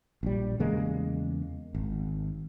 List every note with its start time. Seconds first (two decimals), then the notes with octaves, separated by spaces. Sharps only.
0.23 A#1 G3
0.59 E2 C#3 G#3 A#3
1.75 G#1